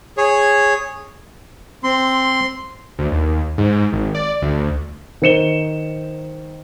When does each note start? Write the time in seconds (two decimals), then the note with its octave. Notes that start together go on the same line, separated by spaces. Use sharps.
0.17 G#4 C#5
1.84 C4 C6
2.99 D2
3.12 D#2
3.58 G#2
3.92 G#1
4.15 D5
4.42 D2
5.22 D#3 C5 C#7 E7 G7